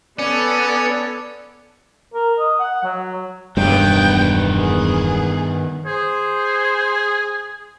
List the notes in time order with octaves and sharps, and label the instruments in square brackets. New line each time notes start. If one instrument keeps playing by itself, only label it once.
[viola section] B3 A4 [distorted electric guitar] C#4 [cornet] D5
[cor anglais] A#4
D#5
F#5
F#3
[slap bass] E1 [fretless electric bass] G2 [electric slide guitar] D#3 B3 [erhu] G5
[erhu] G#4
[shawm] G#4 [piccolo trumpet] C5